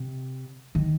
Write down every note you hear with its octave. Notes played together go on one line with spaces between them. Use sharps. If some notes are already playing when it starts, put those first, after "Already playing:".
Already playing: C3
D#3